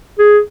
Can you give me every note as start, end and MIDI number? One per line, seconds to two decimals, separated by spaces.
0.18 0.39 68